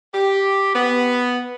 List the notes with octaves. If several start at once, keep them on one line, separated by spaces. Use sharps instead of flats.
G4
B3